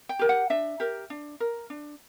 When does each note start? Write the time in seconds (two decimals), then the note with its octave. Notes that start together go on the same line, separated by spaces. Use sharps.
0.09 G5
0.19 G4 A#4
0.29 F#5
0.50 D4 E5
0.80 G4 A#4
1.10 D4
1.40 A#4
1.70 D4